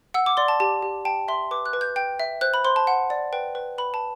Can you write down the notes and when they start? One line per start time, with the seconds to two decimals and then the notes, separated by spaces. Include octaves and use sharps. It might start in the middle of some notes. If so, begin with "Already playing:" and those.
0.14 F#5 E6
0.26 D6
0.37 D5 C6
0.48 A5
0.60 G4 A5
0.82 G4
1.05 G5 A5
1.28 E5 C6
1.51 B4 D6
1.66 F#6
1.73 B4
1.81 G6
1.96 G5 G6
2.20 E5
2.41 C5 F#6
2.54 B5
2.65 C5 C6
2.76 A5
2.87 F#5
3.10 D5
3.33 B4 G5
3.55 B4
3.78 B4 B5
3.94 A5